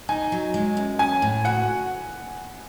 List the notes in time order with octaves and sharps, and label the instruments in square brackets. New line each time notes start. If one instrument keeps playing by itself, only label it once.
[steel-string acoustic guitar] D#4 [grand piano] G#5
[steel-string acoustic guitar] F#3
G#3
F#2
[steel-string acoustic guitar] C#4 [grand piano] G#5
[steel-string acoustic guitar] A2
[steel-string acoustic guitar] F#4 [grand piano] F#5